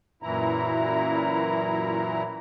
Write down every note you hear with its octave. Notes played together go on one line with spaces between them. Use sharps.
F#2 A#2 E3 E4 A#5